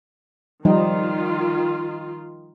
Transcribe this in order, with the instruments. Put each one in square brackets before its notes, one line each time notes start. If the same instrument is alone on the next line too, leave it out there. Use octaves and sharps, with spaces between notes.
[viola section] D#3 F4 [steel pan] F3 G3 D#4